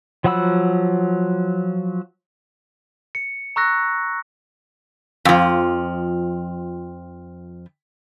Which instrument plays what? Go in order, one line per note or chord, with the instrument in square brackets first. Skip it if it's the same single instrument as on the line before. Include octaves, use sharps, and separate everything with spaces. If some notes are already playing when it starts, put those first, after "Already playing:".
[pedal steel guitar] F3 F#3 F#5 B5 E6
[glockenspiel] C#7
A#5 C#6 E6 F#6 A#6
[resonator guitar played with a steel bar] F2 F3